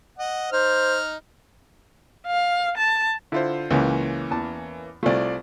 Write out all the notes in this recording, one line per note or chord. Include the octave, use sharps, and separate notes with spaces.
D#5 F#5
D#4 C5 F6
F5
A5
D3 E4 F4 C5
C#2 E3 A#3 C#4
E2 A5
C2 A3 F4 D5